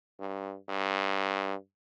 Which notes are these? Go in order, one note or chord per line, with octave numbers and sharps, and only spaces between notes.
G2
G2